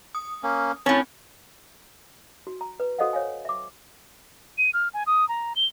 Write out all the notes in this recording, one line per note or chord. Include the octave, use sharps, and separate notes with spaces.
D#6
A#3 C#4
A2 C4 C#4 C#5 A5
F#4
A#5
B4
F#4 A4 C5 D#5 F5 F#5
C5 C#5 F5 G#5
E5 D6
D#7
F6
G#5
D#6
A#5
G7